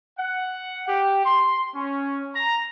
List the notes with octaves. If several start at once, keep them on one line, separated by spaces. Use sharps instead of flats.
F#5
G4
C6
C#4
A#5